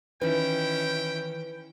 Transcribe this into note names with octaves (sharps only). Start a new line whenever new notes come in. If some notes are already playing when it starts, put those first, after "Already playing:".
D#3 E3 C#4 E4 B4 G5